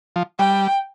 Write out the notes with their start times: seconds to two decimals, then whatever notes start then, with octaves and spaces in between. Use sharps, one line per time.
0.16 F3
0.39 G3 G5